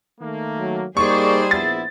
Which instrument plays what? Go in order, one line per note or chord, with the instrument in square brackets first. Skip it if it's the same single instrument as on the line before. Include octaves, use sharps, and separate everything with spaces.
[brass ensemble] D#3 A3 A#3
[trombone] F#3
[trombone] G3 [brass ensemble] A#3 D#4 D5 [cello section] G#4 C5 [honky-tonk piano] C#6
[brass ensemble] A#1 B3 E4 [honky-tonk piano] A6